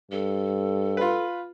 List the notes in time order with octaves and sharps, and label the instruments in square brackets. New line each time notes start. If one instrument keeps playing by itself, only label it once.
[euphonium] G2 [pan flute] A4
[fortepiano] F4 B4